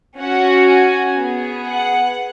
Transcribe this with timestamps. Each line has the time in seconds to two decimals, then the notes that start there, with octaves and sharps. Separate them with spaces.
0.18 C#4 F#4 F#5
0.68 G#5
1.17 B3 G#4
1.67 F#5